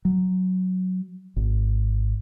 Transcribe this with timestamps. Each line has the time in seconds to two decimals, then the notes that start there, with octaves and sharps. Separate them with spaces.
0.05 F#3
1.36 G#1